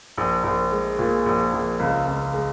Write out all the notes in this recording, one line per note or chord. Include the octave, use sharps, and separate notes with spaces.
A#1
A#1
G#3
A#2
A#1
A#1
C#2
C#2
G#3